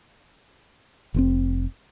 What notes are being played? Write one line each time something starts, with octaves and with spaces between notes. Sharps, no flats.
F1 C3 C4